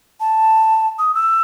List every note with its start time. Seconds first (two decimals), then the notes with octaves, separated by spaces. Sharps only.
0.20 A5
0.99 D#6
1.15 E6